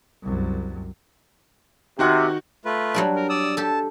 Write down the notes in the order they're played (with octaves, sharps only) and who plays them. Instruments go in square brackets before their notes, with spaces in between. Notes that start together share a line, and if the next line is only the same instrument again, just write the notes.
[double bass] C2 F#2
[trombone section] C3 [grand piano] D#3 F#4 F#5
[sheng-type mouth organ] A3 F4 B4
[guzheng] F#3 G3 D4
[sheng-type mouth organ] A#4
D5 D#6 E6
[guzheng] G4 A4 [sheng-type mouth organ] A5